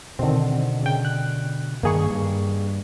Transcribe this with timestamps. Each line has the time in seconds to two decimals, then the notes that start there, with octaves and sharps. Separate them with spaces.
0.19 B2 D3 D#3 C4
0.83 C#3 G5
1.05 F#6
1.83 G2 D#3 A#3 G#4 C#6
2.10 G2